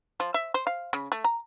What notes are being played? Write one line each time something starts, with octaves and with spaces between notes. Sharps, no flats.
F3
E5
C5
F5
C#3
A3
A#5